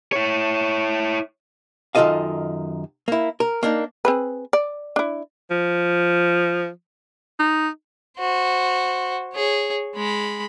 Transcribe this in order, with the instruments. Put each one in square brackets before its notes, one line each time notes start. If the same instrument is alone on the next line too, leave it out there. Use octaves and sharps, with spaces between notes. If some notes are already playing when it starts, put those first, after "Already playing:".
[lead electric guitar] E4 C#5
[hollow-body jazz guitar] F#2 D#3 F4 A4 D#5 F5
A#3 E4
A#4
A#3 D4 D#4
[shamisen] C4 G#4 B4
D5
D4 E4
[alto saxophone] F3
D#4
[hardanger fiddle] F#4 C5
G#4 C#5
G#3 B5